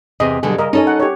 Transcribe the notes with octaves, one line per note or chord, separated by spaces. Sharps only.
E2 C3 G#4 D#5
B2 D3 F#3 G3 G#4
C#3 A#4 D#5
C#4 D#4 A4 D#5
F#5
G4 C#5